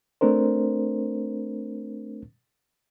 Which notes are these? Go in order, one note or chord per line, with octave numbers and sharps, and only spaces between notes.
A3 C4 D4 A#4 C5